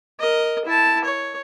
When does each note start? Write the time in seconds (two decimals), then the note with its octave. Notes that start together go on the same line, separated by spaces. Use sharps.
0.20 A#4 D#5
0.66 E4 A5
1.05 C#5